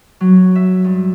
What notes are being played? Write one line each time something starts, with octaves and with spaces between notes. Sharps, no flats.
F#3
E5
G2